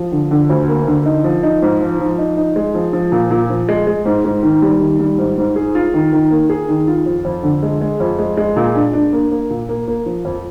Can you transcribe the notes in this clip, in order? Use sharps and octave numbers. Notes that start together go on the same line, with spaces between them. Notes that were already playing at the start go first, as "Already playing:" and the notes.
Already playing: F3
D3
D3
D2
A#3
D3
D#4
F3
D#4
G#2
F3
F3
D#4
D#4
G#3
F3
F3
A#2
A#2
F3
G#3
G#3
G#2
G#2
D#3
G3
D#3
G3
G#2
G#2
G#4
F4
D#3
D#3
A#3
G#4
D#3
F4
F2
F2
D3
G#3
G#3
F2
G#3
G#3
A#2
D4
D4
A#3
A#3
A#2
A#3
A#3
F3
F2